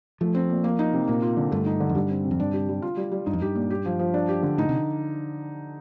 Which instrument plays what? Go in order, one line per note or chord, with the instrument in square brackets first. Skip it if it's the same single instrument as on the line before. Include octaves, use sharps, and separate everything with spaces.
[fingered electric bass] F3 [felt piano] A3
[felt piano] C4
A#2
A#3
D#4
C3
[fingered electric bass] A#2 [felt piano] A#3
[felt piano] F4
D3
[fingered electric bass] G2 [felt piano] A3
[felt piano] D#4
D3
[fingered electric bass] F2
[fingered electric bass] G2 [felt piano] G3
[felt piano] C4
C3
[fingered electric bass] F2
[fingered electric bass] G2 [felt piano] D4
[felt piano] G4
G3
F4
G3
G3
[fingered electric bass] G2 [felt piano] D#4
[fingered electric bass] F2
[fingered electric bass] G2 [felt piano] G4
[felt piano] A#2
G4
F3
F3
D4
G4
D3
[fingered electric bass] A2 [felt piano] D#4
[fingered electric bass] C3